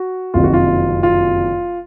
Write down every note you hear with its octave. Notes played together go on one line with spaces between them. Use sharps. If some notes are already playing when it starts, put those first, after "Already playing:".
Already playing: F#4
F#1 F2 C3 D#3 F#3 F4
F#4
F4
F4